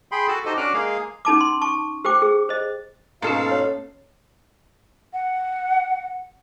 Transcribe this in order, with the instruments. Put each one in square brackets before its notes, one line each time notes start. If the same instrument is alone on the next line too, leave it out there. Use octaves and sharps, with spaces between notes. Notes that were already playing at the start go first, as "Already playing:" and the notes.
[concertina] G#4 G5 B5 C6
F#4 A4 A5
D#4 F#4 G4 A4 C5 D#5
C#4 D4 F#4 D6 F6 F#6
G#3 A#3 G#4 F5
[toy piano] C#4 D#4 A5 D6
C6
A5 C#6
G4 C5 G5 D6
G#4
C5 D#5
[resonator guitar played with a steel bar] G#2 A4 [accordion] B2 F5 [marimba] A#3 C#4
[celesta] C#5
[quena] F#5